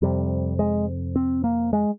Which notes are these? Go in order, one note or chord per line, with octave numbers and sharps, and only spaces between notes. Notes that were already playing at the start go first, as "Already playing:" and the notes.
F2 C3 G3
G#3
C4
A#3
G#3